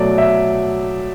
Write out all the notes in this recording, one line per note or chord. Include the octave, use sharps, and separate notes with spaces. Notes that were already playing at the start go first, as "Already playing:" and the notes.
Already playing: B2 F#3 A3 D5
E5